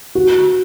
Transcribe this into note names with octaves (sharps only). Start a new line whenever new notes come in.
F#4